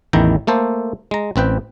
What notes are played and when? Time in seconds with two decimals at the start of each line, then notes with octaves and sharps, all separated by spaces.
0.13 A1 E2 D#3 E4 G5 A#5
0.47 A3 A#3 A4 C5
1.11 G#3 A#5
1.36 A1 C4 B4 G5